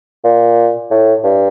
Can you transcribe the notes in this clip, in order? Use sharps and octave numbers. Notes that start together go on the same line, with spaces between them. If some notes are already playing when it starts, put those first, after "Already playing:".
A#2
A2
G2